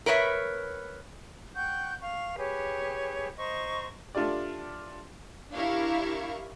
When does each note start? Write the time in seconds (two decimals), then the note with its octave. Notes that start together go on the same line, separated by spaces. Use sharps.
0.06 A#4 B4 C#5 D#5 E5
1.55 F#5 G5 C#6 G6
2.01 F5 C#6
2.37 G4 G#4 B4 C#5
3.38 C5 D#5 A#5 C#6
4.15 A3 D4 F4 G4 D5
5.53 D4 E4 G4 A#4 F5 C#6